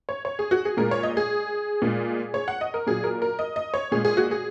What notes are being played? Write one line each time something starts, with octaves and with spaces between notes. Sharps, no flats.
C#5
C#5
G#4
F#4
G#4
A#2 G#3 A#4
C#5
D#5
G#4
A#2 G#3
C#5
F#5
D#5
A#4
A#2 F#3 G#4
A#4
A#4
D#5
D#5
C#5
A#2 G#3 G#4
G#4
F#4
G#4